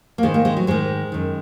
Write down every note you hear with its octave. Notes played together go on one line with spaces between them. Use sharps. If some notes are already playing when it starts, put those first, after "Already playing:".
A#3
G#2 D#3 G#3
A#3
G#3
F#3
G#2 D#3 G#3
F#2 D#3